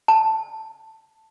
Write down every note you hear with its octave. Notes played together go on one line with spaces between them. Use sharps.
A5